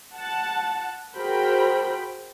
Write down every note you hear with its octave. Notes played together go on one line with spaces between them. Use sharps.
F#5 A5
F#4 G#4 A#4 C5 G5 B5